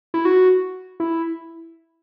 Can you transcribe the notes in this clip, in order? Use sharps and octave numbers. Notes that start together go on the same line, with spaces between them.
E4
F#4
E4